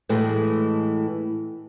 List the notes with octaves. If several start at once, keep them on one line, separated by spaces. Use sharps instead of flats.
A2 E3 G#3 A3